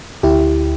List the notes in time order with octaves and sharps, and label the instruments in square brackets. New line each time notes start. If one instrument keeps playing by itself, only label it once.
[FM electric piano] D2 E4 G4